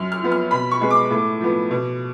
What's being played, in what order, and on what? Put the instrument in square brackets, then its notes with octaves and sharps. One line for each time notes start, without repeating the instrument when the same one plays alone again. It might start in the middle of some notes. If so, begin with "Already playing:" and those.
Already playing: [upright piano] F#2 F6
F6
F3 B3
F6
B2 B5
C#6
G#3 B3
D6
A2
F3 B3
B2